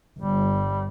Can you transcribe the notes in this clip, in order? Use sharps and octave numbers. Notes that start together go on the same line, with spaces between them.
G1 G3